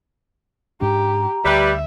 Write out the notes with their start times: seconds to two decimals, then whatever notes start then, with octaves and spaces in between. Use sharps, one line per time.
0.81 G#2 G#3 D4 G4 A#5
1.45 D2 G3 B4 E5